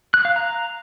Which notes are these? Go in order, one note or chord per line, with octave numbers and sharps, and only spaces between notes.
F#6
F5
A#5